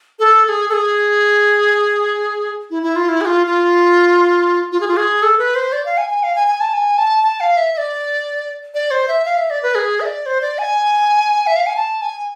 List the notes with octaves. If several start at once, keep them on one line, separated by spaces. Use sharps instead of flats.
A4
A4
G#4
A4
G#4
E4
E4
F4
E4
G#4
F4
F4
F4
G#4
F4
G#4
A4
B4
C5
D5
F5
G#5
G#5
F5
G#5
G#5
A5
G#5
A5
A5
F5
E5
E5
D5
D5
C5
E5
F5
E5
D5
B4
G#4
E5
D5
C5
D5
G#5
E5
F5
G#5
A5
G#5